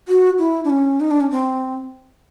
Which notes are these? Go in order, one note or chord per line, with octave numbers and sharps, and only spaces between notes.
F#4
E4
D4
C#4
D#4
D4
C#4
C4